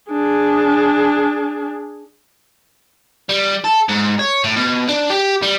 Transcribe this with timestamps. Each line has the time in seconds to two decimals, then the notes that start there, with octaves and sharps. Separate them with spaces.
0.11 D4 G#4
3.29 G3
3.64 A4
3.89 G#2
4.19 C#5
4.44 A2
4.56 B2
4.88 D4
5.10 G4
5.42 G3